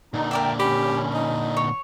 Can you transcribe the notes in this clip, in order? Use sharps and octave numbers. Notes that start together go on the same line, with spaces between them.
A#2 D3 D#4
A#4 D5 E5 G5
C#4 G4 B5
D#4
C#5